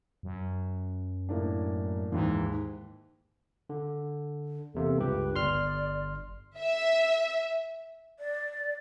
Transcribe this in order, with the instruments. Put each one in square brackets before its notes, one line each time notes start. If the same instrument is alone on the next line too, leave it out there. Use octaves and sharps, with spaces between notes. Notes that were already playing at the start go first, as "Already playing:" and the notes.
[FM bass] F#2
[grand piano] A2 A#3 D4
[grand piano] D#2 G#2 [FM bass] E3
[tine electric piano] D3
[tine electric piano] E2 C3 A#3 [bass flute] A4
[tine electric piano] C#2 G2 G4 [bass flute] B4
[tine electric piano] G1 C6 F6 [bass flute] D5
[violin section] E5
[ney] D5